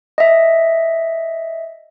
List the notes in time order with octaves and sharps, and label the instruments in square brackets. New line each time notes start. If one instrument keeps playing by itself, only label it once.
[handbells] D#5 E5